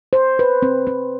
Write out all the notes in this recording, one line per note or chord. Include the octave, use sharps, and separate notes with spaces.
C5
B4
C4
C4